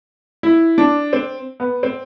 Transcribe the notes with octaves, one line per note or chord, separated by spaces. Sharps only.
E4
D4
C4
B3
C4